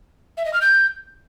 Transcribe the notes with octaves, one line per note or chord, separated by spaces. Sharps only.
E5
D#5
F6
G6